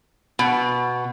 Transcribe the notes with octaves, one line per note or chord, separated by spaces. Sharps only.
B2